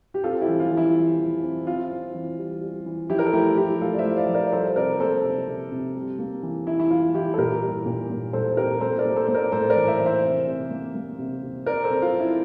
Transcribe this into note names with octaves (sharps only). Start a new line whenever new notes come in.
G4
C4 F4 A4
E4 G4
E3
F4
E3
E4
E3
E3
C4
C4 F4
C4
E3
G3
G3
E3
F3 E4 G4
A#4
A4
A3 E4 G4
F3 E4 G4
A3 F4 A4
D5
C5 E5
A3
D5 F5
F3
A#4 D5
D5
G3 A4 C5
C3 A#4 D5
A#3 A4 C5
C3
C3
C3
G3
A#3
E3
E3 E4
E4
E3 F4
E3 E4 G4
A4
A#2 G4 A#4
G3
A#2
A#2
A#2 A4 C5
C4 G4 A#4
A#3 A4 C5
A#4 D5
A#3
A4 C5
A#3 C5
A#4 D5
A2 A4 C5
A#4 D5
E3
C5 E5
E3
C5 E5
C3
C3
A#3
A#3
C3
C3
C4 A#4 D5
A4 C5
C4
F4
C4
E4